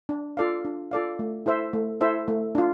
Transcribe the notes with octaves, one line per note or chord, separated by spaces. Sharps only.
D4
F4 A4 D5 F5
D4
F4 A4 D5 F5
A3
E4 A4 C5 E5
A3
E4 A4 C5 E5
A3
D4 F4